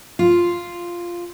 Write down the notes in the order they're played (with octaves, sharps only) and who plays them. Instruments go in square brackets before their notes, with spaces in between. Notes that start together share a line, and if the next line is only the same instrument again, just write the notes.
[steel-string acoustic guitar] F4